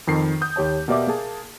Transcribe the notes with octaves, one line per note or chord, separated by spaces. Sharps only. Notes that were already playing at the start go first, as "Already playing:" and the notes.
F2 D#3 C7
D#6 G6
D#2 G4 C#5 A5
B2 A#3 G4 D5 E5 D6
A#3 G#4 A5